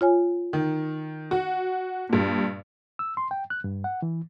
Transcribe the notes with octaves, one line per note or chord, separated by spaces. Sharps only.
F4 C#5 G#5
D#3
F#4
G2 A#2
E6
C6
G5
F#6
G2
F#5
E3